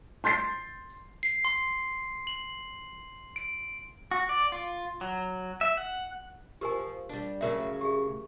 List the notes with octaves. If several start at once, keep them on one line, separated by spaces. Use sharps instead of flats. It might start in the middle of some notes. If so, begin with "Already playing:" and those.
C6 G6 A6 C7
C7
C6
F#7
D7
F#4
D5
F4
F#3
E5
F#5
F3 G4 A#4 G#5
G3 D4
A2 C#3 F#3 A#4 E5
G4 G#4